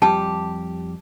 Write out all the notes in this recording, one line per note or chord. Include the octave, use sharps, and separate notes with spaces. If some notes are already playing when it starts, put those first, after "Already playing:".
F2 G3 G4 A5